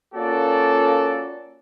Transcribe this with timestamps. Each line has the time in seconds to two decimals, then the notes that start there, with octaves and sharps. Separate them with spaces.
0.14 A#3 C#4 F4 F#4 A4 D5